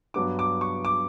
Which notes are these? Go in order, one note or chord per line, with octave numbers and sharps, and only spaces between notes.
G2 F#3 B3 D4 D6
D6
C#6
D6